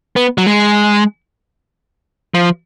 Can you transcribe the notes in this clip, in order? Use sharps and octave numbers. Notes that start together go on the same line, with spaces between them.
B3
F#3
G#3
F3